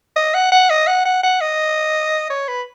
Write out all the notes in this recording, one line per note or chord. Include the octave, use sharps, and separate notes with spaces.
D#5
F#5
F#5
D#5
F#5
F#5
F#5
D#5
C#5
B4